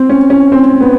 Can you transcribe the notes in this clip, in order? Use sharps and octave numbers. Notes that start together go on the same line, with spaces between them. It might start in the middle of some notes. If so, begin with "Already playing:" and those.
Already playing: C4
C#4
C#4
C4
B3